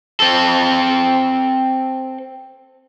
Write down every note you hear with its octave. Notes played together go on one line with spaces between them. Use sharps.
C4 A4